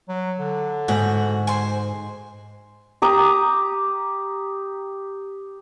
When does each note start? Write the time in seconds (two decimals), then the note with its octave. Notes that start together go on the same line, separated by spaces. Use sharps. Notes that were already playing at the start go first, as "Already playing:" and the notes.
0.09 F#3
0.38 D3
0.88 G#2 F#4
1.47 C5 G#5
3.02 G4 A#5 D#6